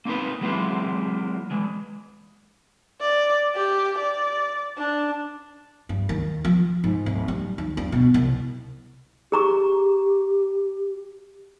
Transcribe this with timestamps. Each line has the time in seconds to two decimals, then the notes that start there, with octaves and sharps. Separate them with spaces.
0.05 A#3 C4 D#4 A#4 B4
0.41 E3 F#3 G#3 A#3 C4 E4
1.51 E3 G#3
3.01 D5
3.56 G4
3.99 D5
4.78 D4
5.89 G2
6.09 D#2
6.45 F3
6.84 G#2
7.06 D1
7.28 G3
7.58 D#2
7.77 G2
7.92 B2
8.14 C2
9.32 G4 G#4 A#5 C#6